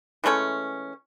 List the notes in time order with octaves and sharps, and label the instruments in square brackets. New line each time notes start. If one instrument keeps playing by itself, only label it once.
[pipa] E3 G#3 A3 C#4